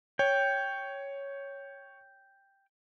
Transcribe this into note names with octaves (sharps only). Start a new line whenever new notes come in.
C#5 G5